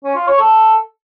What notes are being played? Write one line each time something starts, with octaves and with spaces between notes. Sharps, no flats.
C#4
F4
C#5
A4